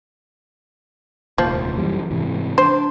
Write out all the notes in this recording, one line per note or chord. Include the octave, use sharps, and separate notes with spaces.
F1 D#2 A#2 F3
F#2 E3 G3
G#2 C3 E3
D4 C5